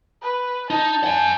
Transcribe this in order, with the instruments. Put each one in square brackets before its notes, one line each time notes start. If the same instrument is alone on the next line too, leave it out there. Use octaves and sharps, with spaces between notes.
[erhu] B4
[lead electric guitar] D#4 [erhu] A5
[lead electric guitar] F#5 G#5